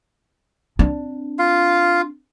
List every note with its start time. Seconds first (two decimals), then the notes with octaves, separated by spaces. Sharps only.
0.79 C4 D4
1.39 F4 F5